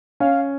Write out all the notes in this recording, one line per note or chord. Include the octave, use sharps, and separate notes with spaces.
C#4 F5